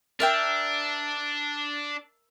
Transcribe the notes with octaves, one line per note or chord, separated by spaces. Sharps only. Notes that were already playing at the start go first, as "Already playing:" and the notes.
D4 A#4 E5 G5